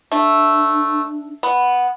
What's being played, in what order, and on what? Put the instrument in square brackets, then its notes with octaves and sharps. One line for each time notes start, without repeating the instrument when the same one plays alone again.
[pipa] A3 [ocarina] D4
[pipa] B3